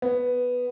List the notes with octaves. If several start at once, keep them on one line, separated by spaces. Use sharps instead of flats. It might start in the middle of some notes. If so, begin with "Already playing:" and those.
B3